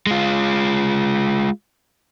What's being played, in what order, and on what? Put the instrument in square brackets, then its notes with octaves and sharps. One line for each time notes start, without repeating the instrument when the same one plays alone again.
[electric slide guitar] G#3 F4